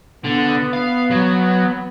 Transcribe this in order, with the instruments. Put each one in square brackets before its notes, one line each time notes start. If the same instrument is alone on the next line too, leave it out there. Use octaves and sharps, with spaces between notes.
[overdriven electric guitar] D3 [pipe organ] B3
[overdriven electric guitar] F5
F#3